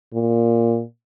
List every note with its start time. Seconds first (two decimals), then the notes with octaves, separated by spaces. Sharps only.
0.14 A#2